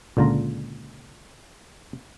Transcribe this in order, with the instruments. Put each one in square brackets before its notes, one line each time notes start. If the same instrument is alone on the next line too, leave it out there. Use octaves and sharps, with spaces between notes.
[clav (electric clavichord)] C#2 A#2 D3 F4 A#5